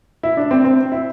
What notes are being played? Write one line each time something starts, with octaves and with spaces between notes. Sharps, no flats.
E4
D4
C4
C4
E4